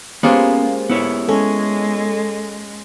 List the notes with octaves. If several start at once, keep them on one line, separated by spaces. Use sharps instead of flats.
G#3 A#3 B3 C#4 F4 G4 C5
B3 E4 C#5
G#3 C#4 A4